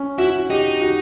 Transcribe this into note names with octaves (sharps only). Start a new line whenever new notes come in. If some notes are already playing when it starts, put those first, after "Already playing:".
Already playing: C#4
E4 F#4
D#4 G4
F#4